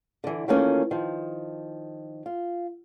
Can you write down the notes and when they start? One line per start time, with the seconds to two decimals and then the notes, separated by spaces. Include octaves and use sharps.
0.24 D3 E3
0.48 D#3 E3 A3 A#3 C#4 F4
0.91 D#3 F3
2.26 F4